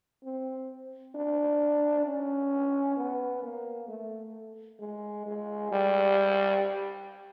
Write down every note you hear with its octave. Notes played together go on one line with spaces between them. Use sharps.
C4
D4
C#4
B3
A#3
A3
G#3
G#3
G3